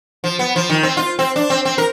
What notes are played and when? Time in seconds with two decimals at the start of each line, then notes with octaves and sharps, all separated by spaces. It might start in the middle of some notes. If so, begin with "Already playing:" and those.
0.24 F3
0.39 B3
0.56 F3
0.70 D#3
0.83 C4
0.97 F4
1.19 C4
1.36 D4
1.50 C4
1.65 C4
1.78 A#4